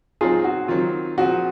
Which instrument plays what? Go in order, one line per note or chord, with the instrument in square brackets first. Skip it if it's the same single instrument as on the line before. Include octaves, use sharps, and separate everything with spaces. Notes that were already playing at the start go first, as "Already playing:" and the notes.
[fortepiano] A#2 F#3 C4 D#4 [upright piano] F4 G#4
[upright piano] F#4
[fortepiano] D#3 F#3 C4 [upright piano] F4
[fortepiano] A#2 F3 C4 F4 G#4 [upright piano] F#4